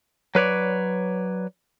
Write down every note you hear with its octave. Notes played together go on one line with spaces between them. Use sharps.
F#3 B4 C#5 D5